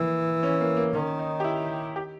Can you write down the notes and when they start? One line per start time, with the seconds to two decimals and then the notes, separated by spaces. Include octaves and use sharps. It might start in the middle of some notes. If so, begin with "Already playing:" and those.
Already playing: E3 A#3
0.43 C#4
0.60 A#3
0.77 A#3
0.94 D#3 C#4
1.19 D#4
1.40 G4
1.44 E4
1.96 G4